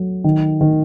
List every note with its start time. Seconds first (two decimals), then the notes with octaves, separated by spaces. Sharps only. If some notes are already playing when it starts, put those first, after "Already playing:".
Already playing: F#3 A3
0.24 D#3
0.61 D#3